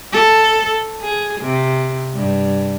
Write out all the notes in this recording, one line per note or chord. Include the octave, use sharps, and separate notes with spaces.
A4
G#4
C3
G2